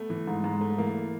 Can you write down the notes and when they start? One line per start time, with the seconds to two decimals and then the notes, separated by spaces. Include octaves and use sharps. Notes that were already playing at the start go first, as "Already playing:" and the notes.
Already playing: A3 B3
0.10 E3
0.27 G#2
0.44 G#2
0.61 A3
0.78 E3 A#3